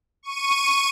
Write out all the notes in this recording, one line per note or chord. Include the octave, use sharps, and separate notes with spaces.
C#6 D#7